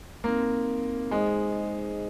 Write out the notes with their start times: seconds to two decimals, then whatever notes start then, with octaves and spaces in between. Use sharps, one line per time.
0.24 A#3 C4 D#4 A#4
1.11 G#3 D#4 G#4 C5 D#5